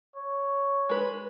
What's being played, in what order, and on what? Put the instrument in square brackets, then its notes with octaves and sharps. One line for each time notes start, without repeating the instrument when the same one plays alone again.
[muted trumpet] C#5
[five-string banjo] G#3 B4